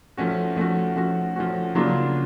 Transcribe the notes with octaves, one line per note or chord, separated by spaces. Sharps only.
F3 A3 C#4 F#4
F3 A3 C#4 F#4
F3 A3 C#4 F#4
F3 A3 C#4 F#4
C#3 F#3 A#3 D4 F4